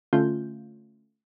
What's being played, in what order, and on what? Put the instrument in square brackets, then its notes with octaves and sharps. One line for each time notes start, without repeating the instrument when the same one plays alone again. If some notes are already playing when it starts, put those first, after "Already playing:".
[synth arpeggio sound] D3 A3 C#4 F4 G6